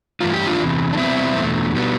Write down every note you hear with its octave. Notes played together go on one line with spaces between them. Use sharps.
G2 E3 A3 F4
G4
D4 F4
E2 C3 E3
D4
E2 C3 G3 B3 C4 E4
E2 B2 A3
B2 G3 B3